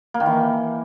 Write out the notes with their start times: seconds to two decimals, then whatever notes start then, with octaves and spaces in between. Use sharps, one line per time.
0.14 A#3
0.20 D#3
0.26 E3